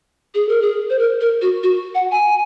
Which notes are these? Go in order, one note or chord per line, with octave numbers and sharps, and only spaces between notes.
G#4
A#4
G#4
C5
A#4
A#4
F#4
F#4
F#5
G#5